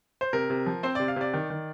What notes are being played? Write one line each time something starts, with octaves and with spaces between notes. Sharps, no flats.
C5
C3 A#4
C3
F3
C4 C5
C3 D5
F5
C3 D5
D#3
D#3